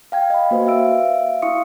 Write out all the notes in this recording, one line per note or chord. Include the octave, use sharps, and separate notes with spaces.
F5 G5 G#6
D#5 B5
A#3 F#4 B4 C5
E5 F5 E6 D7
E4 F5 C6 C#6 D#6 C#7